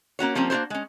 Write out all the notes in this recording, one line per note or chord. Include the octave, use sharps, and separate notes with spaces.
A#3 C#4 F#4 C#5
F3 G3 A#3 C4 C#4
A#3 D4 F4 F#4 C5
G#3 C#4